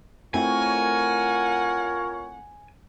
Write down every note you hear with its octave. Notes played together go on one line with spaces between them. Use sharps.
A3 C4 E4 F4 A#4 C#5 F#5 G#5